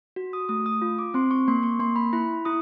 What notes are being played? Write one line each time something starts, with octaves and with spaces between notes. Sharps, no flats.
F#4
D#6
A3 D#6
D#6
F4
D6
C4 C6
C#6
A#3 C6
C#6
A#3 C6
B5
E4 B5
E4 D#6